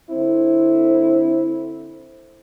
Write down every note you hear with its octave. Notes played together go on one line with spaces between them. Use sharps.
D3 C4 E4